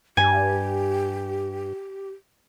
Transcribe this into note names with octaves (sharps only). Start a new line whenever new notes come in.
G2 G4 G#5